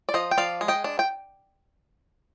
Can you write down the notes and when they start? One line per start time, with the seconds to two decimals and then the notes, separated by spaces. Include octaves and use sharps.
0.09 D5
0.14 F3 C5 D#5
0.31 G5
0.37 F3 D5 F5
0.61 G#3
0.68 D#5 G5
0.84 D4
0.99 G5